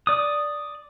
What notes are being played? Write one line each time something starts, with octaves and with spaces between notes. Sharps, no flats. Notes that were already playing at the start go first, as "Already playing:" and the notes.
D5 D#6